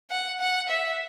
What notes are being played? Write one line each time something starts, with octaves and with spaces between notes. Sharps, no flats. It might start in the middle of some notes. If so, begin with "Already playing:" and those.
F#5
F#5
E5